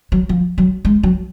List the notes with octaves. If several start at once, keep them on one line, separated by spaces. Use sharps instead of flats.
F#3
F3
F#3
G#3
F#3